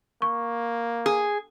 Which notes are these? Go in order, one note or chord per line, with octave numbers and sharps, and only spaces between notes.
A#3 C#6
G#4